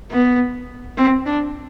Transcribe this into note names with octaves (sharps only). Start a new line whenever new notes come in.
B3
C4
D4